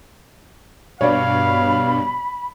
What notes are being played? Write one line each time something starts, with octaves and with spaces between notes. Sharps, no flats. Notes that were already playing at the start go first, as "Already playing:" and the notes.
G2 B2 C#5 D5 F5 B5